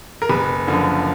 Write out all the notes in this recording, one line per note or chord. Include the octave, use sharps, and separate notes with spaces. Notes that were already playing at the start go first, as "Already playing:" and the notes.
A#4
F#1 B4
F#2 D3 F3